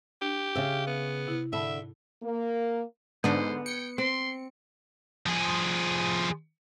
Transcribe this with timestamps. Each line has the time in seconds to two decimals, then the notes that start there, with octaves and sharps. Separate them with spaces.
0.22 D4 G4
0.55 C#3 E5
0.87 B3
1.26 C3 E4
1.53 G#2 D3 E5 A5 B5
2.23 A#3
3.24 G#2 D3 B3 C5
3.66 G5 C#7
3.98 C4 C6
5.26 F3 G#4